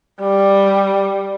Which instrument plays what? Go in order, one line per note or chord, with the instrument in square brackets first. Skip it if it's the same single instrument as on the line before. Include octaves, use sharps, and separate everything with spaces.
[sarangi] G3